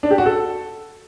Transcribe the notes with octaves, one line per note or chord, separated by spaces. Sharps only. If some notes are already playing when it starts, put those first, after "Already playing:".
D4
G4
F#4
A4